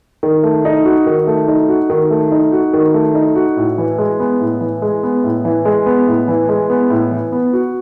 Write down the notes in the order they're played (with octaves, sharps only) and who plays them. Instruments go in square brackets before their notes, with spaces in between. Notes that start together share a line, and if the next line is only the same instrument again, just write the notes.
[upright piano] D#3
A3
D#4
F#4
D#3
A3
D#4
F#4
D#3
A3
D#4
F#4
D#3
A3
D#4
F#4
A2
E3
G#3
B3
A2
E3
G#3
B3
A2
E3
G#3
B3
A2
E3
G#3
B3
A2
E3
B3
F#4